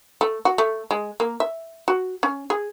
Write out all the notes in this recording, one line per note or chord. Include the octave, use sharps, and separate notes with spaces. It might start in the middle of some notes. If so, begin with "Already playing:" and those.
A3
F#4
A3
G#3
A#3
E5
F#4
C#4
G#4